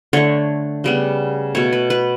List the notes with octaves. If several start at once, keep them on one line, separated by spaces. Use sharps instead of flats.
D3 A3 C#5
C#3 G3 B3
B2 A3 C#5
B4
B4